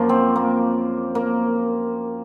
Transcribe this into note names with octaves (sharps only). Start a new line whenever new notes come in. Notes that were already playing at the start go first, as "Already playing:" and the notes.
Already playing: F#2 F3 A#3
C4
A#3
A#3